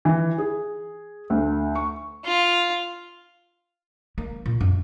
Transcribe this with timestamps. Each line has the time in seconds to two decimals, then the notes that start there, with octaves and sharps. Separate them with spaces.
0.05 E3
0.38 G#4
1.30 D2
1.75 C#6
2.25 F4
4.18 A#3
4.46 A#2
4.61 F#2